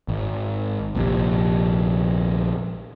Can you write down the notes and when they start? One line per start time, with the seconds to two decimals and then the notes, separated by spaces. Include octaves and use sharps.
0.08 G#1
0.95 A#1 F2 C3